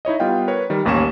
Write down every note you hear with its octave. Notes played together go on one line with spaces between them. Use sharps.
D#4 E4 C#5 D#5
G3 B3 F4 F5 G5
A#4 B4 C#5
D#3 G3
A1 D#2 A#3 C#4 C#6 E7